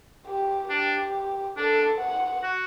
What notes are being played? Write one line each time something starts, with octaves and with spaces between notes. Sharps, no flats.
G4
D4 G4
D4 A4
F#5
F#4